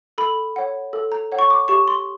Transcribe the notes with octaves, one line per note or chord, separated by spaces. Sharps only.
A4 B5
C#5 F#5
A4
A#5
C#5 F#5
C#6
D6
G4 C#6
C6